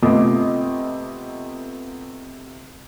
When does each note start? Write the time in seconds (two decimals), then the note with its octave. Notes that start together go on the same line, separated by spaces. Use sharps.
0.02 C3 A3 B3 F4 D#5 D6